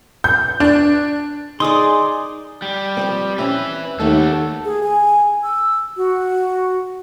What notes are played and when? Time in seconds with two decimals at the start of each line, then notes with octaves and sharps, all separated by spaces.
0.24 G6
0.60 D4
1.60 D#4 G#4 A#4 D5 C6 D#6
2.62 G3
2.97 F3 F#3 C4
3.38 C4 C#4 B4 E5
4.00 D#2 G3 A3 F#4 A4
4.65 G#4
4.83 G#5
5.43 E6
5.97 F#4